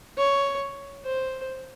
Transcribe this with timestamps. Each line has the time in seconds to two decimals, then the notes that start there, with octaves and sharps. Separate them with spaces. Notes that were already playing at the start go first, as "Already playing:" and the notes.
0.17 C#5
1.05 C5